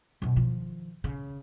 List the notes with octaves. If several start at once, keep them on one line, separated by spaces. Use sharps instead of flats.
F#2 B2
D#3 F3
C#3